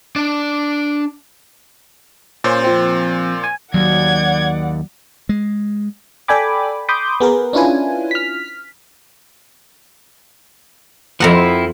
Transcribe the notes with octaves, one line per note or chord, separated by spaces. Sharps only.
D4 D5
A#2 C#4 C5
F3 C4
G#5
D#2 F#3 D5 F#5 G#6
G#3
A4 D5 G5 G#5 B5 D6
B5 C6 D6 D#6 G6
B3 G#4 A#4 B4
C#4 D4 E4 F4 B4 G#5
F6 B6
F2 F3 C4 E4 A#4 F#5